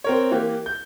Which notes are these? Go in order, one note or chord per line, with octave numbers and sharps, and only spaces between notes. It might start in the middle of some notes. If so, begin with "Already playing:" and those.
C4 A#4 C#5
E3 A#3 G4
G6